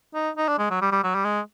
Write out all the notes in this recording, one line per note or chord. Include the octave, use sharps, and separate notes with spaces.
D#4
D#4
D4
G#3
F#3
G3
G3
F#3
G3
G#3